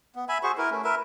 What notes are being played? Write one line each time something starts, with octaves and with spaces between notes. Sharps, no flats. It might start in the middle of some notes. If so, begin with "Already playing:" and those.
B3
E5 G#5 B5
F#4 G#4 C5 C#6
E4 A#4 B4
A3 C#4
A#4 B4 E5